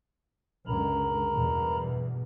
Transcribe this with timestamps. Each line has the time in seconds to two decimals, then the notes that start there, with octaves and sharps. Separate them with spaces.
0.67 C#2 F#2 D3 A#4 A#5 B5
1.33 E2 G2 B2